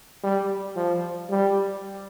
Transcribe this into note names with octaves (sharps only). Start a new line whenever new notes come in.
G3
F3
G3